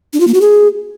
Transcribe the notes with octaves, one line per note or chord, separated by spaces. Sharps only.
D4
F4
A#3
F#4
G#4